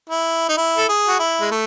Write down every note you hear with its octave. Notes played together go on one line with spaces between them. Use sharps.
E4
D#4
E4
A4
G#4
F#4
E4
G#3
A3